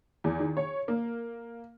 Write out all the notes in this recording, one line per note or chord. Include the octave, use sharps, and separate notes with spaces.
E2
D#3
C#5
A#3